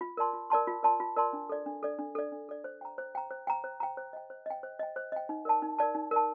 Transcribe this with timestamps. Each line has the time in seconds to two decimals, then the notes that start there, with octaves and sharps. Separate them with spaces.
0.01 F4
0.17 A#4 D5 A5 C6
0.33 F4
0.50 A#4 D5 A5 C6
0.67 F4
0.83 A#4 D5 A5 C6
1.00 F4
1.16 A#4 D5 A5 C6
1.33 D4
1.49 A4 D5
1.66 D4
1.83 A4 D5
1.99 D4
2.15 A4 D5
2.32 D4
2.49 A4 D5
2.64 C5
2.81 G5 A#5
2.98 C5
3.15 G5 A#5
3.31 C5
3.47 G5 A#5
3.64 C5
3.80 G5 A#5
3.97 C5
4.13 D#5 G5
4.30 C5
4.46 D#5 G5
4.63 C5
4.79 D#5 G5
4.96 C5
5.12 D#5 G5
5.29 D#4
5.45 A#4 D5 A5
5.62 D#4
5.79 A#4 D5 A5
5.95 D#4
6.11 A#4 D5 A5